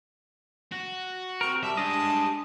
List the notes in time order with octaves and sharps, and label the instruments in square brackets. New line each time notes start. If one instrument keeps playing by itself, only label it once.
[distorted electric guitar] F#4
[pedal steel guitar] C4 A#4 [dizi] C#6
[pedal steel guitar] G3 [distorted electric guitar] E5 [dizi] A5
[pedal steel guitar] G#3 D#5 [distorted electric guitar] D4 G4